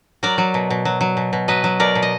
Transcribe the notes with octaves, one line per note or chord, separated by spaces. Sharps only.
F#3 A#4 D5
F#3
B2
B2
F#3
F#3
B2
B2
F#3 B4 D#5
F#3
B2 A#4 D5
B2
D#5